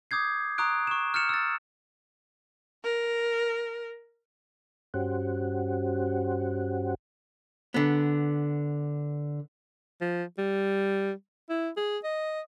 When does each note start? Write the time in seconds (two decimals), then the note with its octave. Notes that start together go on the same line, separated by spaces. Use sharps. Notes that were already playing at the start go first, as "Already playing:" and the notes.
0.11 D6 D#6 G6 G#6 C7
0.58 A#5 C#6 D#6 F#6 D7
0.87 C#6 E7
1.14 F6 G6 A6 C#7 E7 F7
1.29 E6 A6
2.83 A#4
4.94 G2 C#4 F#4 G4 C5 F#5
7.74 D3 B3
10.01 F3
10.38 G3
11.50 E4
11.77 G#4
12.04 D#5